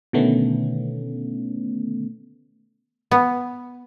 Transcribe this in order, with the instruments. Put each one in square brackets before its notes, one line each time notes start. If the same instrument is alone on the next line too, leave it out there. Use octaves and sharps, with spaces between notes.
[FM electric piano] B2 D3 D#3 A3 B3 C#4
[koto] B3